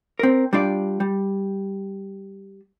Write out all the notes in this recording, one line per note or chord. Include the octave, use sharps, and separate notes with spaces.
C4 A#4
G3 D4 F4 D5
G3